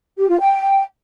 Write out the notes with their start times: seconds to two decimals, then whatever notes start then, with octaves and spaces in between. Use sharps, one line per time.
0.17 G4
0.29 F4
0.40 G5